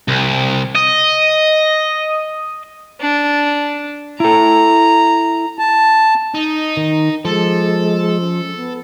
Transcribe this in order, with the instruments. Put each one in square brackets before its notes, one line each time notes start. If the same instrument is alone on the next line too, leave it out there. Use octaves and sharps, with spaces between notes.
[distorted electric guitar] C2
D#5
[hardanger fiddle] D4
[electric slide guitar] E4 A4 [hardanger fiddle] A#5
[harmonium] A5
[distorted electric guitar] D#4
[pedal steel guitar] D#3
[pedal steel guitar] F3 [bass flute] G#3 [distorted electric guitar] A4
[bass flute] C#4
B3